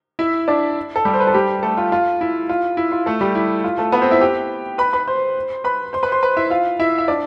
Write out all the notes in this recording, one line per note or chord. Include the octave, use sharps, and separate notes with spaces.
E4 E5
D4 D5
A4
G3 G4
C5
B4
A4
G3 G4
A3 A4
F4
F4
E4
F4
E4
F4
A3 A4
G3 G4
E4
F4
A3 A4
B3 B4
C4 C5
E4 E5
G4 G5
B4 B5
B4 B5
C5 C6
B4 B5
C5 C6
B4 B5
C5 C6
B4 B5
E4 E5
F4 F5
E4 E5
E5
D4 D5